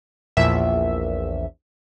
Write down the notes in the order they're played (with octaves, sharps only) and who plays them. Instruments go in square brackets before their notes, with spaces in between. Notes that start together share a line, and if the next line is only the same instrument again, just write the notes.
[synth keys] A#1 E2 E5